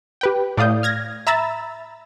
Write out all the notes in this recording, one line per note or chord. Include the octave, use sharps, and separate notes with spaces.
G4 B4 G5
A2 D5 F5 D#6 G6
F6 G#6 A#6
E5 A#5 B5 E6 A6 E7